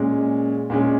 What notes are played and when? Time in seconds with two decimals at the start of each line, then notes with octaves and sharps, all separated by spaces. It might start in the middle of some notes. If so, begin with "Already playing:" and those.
Already playing: A#2 G#3 C#4
0.70 A#2 G#3 C#4